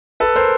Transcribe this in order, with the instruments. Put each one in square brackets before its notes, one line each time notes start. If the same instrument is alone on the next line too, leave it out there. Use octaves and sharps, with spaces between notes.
[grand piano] A4 B4
A#4 C5